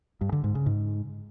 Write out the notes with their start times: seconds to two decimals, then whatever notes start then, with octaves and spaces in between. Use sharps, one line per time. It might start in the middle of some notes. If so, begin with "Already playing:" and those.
0.21 G2
0.32 D3
0.44 G#2
0.55 C#3
0.66 G#2